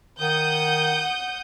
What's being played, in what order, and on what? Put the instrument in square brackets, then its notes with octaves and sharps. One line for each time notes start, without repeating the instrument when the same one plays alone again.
[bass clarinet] D#3 [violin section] F#5 D#6 G6